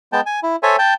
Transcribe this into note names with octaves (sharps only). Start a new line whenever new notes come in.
G#3 B3 G5 A5
G#5
E4
A4 C5 C#5 E5 G#5
G5 A5